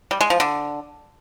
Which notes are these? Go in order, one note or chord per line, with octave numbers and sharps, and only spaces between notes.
G3
G#3
F3
D3